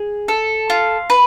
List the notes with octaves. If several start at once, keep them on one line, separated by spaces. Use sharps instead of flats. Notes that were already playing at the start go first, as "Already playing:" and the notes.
Already playing: G#4
A4
F4
B4